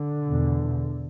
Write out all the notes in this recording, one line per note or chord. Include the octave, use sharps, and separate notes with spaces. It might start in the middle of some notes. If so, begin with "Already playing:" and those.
Already playing: D3
E2 B2